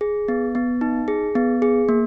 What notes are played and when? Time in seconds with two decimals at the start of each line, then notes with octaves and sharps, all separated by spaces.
0.01 G#4
0.28 B3
0.55 B3
0.81 D#4
1.08 G#4
1.35 B3
1.62 G#4
1.89 A#3